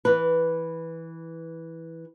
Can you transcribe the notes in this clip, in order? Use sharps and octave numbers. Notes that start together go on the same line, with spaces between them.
E3 B4